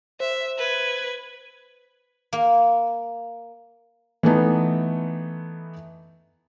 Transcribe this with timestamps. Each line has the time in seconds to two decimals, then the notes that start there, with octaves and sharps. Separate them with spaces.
0.20 C5 E5
0.58 B4 G#6
2.33 A#3
4.23 E3 A3 B3 D#4